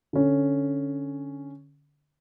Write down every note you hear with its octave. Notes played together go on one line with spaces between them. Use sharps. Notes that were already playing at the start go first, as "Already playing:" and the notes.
D3 C#4